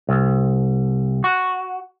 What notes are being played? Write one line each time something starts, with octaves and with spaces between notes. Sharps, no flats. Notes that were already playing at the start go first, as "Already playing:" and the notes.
C2
F#4